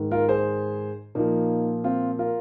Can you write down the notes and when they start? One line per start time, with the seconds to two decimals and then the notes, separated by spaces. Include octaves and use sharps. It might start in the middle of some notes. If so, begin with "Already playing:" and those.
Already playing: G#2 D#3
0.11 F4 A#4
0.28 G#4 C5
1.15 A#2 F3 A#3 D#4
1.84 C4 F4
2.19 F4 A#4